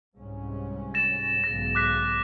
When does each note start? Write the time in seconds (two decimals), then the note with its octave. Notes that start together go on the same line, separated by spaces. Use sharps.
0.15 C2 G#2 C#4
0.94 A6 A#6 E7
1.44 B1 G#2 C#3 A#6
1.75 D6 F#6 B6